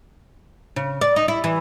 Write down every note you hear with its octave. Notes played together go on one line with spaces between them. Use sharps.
C#3
D5
D#4
E4
E3